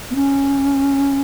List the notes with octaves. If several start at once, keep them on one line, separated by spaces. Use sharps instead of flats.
B3
C#4